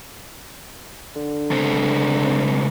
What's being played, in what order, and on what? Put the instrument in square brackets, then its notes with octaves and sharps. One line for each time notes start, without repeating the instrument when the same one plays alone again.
[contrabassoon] D3
[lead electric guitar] C#2 C4